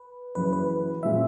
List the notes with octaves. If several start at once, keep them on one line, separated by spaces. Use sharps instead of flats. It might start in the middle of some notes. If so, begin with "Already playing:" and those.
Already playing: B4
F#1 F#2 E3 B4
B4
A#2 G#3 C#4 E5